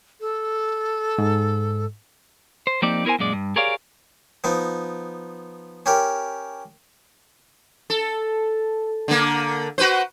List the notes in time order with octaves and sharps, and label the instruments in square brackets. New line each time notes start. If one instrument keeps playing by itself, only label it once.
[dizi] A4
[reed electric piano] G#2
[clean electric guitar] C5
F3 A#3 C4 D#4 G4 D5
B3 E4 A#4 C5 G#5
F#2 A#2 G#3 D5
G2
G4 G#4 A#4 C#5 D5 F5
[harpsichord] F3 B3 D#4
C#4 G4 A#4
[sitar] A4
D3 A#3
F#4 B4 C5